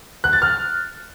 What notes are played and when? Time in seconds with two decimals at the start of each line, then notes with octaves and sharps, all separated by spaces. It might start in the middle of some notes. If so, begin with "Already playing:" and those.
0.24 F#6
0.33 A6
0.42 F6